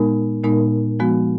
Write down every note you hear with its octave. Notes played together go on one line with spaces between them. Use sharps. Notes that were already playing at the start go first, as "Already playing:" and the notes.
Already playing: A#2 G#3 B3 D#4 A#4
A#2 G#3 B3 D#4 A#4
F3 G#3 B3 F#4